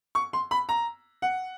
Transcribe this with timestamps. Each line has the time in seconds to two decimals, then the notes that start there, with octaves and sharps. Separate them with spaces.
0.15 C#6
0.33 C6
0.51 B5
0.69 A#5
1.22 F#5